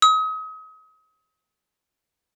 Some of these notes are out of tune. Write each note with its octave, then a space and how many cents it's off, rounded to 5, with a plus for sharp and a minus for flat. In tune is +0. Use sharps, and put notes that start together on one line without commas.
D#6 +35